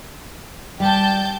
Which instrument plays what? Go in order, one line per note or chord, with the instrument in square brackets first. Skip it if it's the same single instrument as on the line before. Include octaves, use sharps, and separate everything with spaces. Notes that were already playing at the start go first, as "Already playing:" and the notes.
[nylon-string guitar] G3 [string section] G5 A5 G6